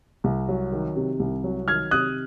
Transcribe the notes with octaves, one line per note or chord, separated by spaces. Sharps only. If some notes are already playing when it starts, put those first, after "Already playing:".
C2
F#3
D#3
C3
C2
F#3
D#3 F6 G#6
C3 D#6 F#6